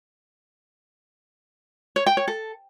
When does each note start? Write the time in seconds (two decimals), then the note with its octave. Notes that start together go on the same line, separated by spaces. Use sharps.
1.96 C#5
2.06 G5
2.17 C#5
2.28 A4